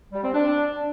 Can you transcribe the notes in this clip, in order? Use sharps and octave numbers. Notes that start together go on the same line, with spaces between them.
G3
C4
D4